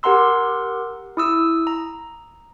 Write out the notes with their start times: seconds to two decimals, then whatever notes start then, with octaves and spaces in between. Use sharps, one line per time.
0.03 G4 A#4 F#5 A#5 C6 E6
1.17 E4 D#6 E6
1.67 A#5